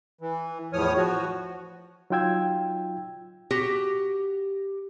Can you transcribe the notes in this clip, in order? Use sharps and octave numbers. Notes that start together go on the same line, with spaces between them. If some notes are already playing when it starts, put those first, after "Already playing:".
E3
E2 A2 F3 C#5 D#6 F6
F3 F#4
F#3 D#4 F4 G5 E6 G#6
F#4 G4